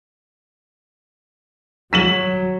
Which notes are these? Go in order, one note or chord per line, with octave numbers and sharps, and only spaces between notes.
F#3 B6 E7 F#7